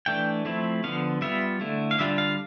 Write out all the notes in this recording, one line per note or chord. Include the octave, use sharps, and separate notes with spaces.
E3 A3 D4 G5
F3 A3 C4 E4
D3 F3 B3 F5
G3 B3 F4 E5
D3 A3 E4
F5
D3 G3 D4 F4 E5
F5